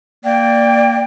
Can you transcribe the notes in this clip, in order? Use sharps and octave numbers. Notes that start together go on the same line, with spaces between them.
A#3 D5 G5